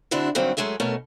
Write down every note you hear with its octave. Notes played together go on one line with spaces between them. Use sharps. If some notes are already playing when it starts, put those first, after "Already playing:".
D3 C4 D4 E4 F#4
G2 D3 D#3 F#3 C4
F#3 G#3 A3 G#4 E5
B2 A3 C#4 A#4